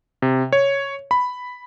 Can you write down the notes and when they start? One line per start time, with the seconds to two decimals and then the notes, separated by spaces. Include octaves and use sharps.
0.22 C3
0.53 C#5
1.11 B5